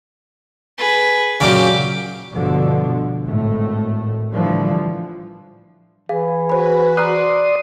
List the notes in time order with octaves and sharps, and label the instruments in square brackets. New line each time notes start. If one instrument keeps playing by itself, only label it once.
[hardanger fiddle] G#4 B4
[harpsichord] F#2 A#2 C#3 [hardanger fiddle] G4 D6
[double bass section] G1 B2 D3 F3
G#1 A2 A3
A2 D3 E3 F3 G3
[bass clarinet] E3 [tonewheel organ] G#4 [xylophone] F5
[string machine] F#4 B4 [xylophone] C5 B5
[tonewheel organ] D5 C6 D#6 [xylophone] A#5 F6 F#6